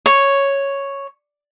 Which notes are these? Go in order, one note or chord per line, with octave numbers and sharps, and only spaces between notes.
C#5